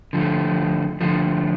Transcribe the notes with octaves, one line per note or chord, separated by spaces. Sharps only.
D3 F3 A3
D3 F3 A3